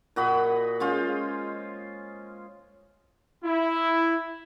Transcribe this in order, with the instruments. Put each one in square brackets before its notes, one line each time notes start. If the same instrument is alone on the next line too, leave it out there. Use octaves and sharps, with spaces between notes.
[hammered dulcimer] A#2 F#4 D#5 B5
G#3 C#4 F4 C5
[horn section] E4